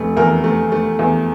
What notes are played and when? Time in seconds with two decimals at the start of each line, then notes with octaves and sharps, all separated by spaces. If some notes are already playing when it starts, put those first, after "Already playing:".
Already playing: F1 A3
0.17 E2 A#4
0.44 A3
0.72 A3
0.99 E2